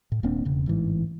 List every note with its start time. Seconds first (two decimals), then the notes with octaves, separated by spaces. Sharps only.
0.12 A2
0.23 D#1 A#3 C4 D4
0.45 E1 C#3
0.66 A1 G#2 E3